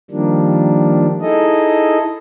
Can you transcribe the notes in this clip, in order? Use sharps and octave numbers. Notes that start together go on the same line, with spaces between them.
D#3 F3 G3 A#3 D4
D#4 E4 G#4 A4 D#5